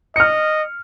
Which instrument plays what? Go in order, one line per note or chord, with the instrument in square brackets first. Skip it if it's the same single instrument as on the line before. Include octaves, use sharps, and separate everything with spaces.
[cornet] D#5 [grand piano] F6 C#7